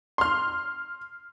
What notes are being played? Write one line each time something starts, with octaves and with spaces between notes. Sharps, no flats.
C6 F6